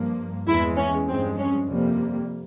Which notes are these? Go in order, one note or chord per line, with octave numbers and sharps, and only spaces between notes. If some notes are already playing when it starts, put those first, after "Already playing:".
Already playing: G2 F3 A#3
E2 E3 G#3 E4
C#4
G2 F3 G#3 C4
C#4
F2 C3 G3 A#3